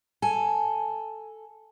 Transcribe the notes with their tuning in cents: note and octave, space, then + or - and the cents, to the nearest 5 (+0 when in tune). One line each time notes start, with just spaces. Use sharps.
A4 +0 G#5 +0